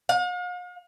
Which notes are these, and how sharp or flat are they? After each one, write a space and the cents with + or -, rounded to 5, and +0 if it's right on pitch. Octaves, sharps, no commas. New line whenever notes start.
F5 +45